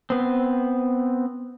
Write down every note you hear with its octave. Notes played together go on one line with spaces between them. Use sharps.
B3 C4